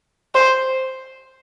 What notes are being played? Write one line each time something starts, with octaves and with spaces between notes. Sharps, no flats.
C5